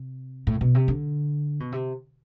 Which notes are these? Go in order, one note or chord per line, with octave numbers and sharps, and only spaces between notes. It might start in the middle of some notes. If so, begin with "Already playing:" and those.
Already playing: C3
A2
B2
C3
D3
B2
C3